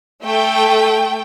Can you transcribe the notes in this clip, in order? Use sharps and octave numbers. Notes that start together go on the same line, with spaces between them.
A3 G5